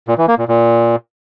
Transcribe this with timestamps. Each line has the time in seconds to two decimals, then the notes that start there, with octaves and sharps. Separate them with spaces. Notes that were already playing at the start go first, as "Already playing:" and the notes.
0.08 A#2
0.18 E3
0.28 A#3
0.38 A#2
0.48 A#2